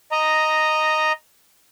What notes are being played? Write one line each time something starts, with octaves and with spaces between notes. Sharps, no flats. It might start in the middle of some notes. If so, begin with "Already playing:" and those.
D#5 A#5